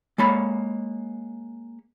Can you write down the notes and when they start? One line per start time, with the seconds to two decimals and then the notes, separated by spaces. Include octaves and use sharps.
0.18 G#3 A#3 C#5 B5